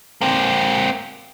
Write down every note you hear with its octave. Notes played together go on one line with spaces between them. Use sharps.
A#3 C4